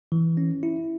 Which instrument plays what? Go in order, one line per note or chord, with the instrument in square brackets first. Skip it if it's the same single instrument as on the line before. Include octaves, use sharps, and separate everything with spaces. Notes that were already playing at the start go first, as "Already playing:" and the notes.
[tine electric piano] E3
C#4
E4